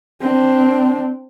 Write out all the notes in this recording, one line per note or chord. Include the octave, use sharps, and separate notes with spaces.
C4 D4